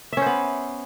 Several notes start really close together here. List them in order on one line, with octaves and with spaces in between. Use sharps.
E5 C#4 C5 B3